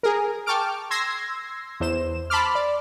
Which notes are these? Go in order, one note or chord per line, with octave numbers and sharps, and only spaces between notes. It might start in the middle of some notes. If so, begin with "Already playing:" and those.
G#4 A#4
G5 A5 C#6 D6 F6 D7
C6 E6 G#6 A#6 C7
E2 C5 E7
A5 B5 C6 D6 F6
D5